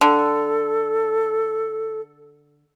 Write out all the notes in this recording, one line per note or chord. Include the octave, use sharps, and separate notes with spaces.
D3 A4